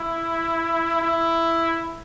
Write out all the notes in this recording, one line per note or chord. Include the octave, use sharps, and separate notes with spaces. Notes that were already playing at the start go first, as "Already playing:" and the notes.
Already playing: E4
E4